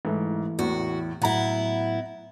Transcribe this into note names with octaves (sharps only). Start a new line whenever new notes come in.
G#2 E3 A3 E4
E2 A2 F#4
A2 F#3 B3 E4 F#5 A#5